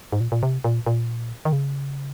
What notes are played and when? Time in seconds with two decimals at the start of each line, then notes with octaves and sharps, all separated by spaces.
0.12 G#2
0.20 A#2
0.32 A#2
0.43 C3
0.64 A#2
0.86 A#2
1.45 D#3
1.53 C#3